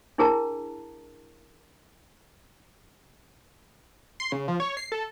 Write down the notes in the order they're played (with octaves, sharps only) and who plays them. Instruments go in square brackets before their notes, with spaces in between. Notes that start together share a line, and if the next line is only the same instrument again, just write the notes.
[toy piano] D4 E4 G#4 A#4 A5 A#5
[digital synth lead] C6
C#3
F3
C#5
C7
A4